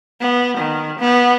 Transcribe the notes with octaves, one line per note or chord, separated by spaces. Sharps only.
B3
D#3
B3